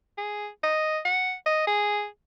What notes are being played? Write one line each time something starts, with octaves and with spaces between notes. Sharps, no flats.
G#4
D#5
F#5
D#5
G#4